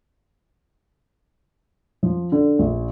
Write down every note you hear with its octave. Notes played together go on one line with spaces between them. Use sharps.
F3
D3
A#1